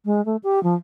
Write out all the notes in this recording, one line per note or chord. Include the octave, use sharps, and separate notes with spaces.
G#3
A3
G4
F3